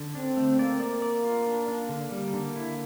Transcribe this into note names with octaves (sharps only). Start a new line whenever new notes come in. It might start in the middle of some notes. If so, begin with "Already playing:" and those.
Already playing: D3
C4 D4
A3
A#3 D5
D5
D5
F4
D4
D4
D3
G3
D3
E4